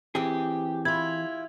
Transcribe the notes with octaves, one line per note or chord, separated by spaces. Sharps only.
E3 C4 G4 G#4
E4 F4 G#6